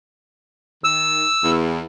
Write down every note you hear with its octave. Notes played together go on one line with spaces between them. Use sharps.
D#3 E6
E2